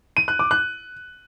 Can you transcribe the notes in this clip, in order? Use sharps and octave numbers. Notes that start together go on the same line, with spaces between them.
D#7
F#6
D6
F#6